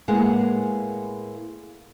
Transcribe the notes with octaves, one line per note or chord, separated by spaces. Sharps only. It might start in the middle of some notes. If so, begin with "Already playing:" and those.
A2 G#3 A#3 B3 G#4 F#5